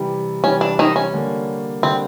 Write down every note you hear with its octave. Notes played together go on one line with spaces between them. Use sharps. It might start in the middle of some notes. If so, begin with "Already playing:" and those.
Already playing: C3 E3 G3
C3 E3 G3 C#4
D4
D#3 D#4
C#4
D3 G3 A#3
D3 G3 A#3 C4